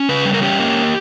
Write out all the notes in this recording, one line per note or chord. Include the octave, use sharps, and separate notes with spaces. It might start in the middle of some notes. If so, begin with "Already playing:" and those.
Already playing: C#4
C#3 B4
G3
A#4
C#4 G4
A#3